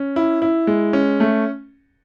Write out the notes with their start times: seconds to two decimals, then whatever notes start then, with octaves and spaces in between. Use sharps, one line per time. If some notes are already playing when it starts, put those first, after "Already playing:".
Already playing: C#4
0.16 E4
0.42 E4
0.67 G#3
0.93 C#4
1.20 A3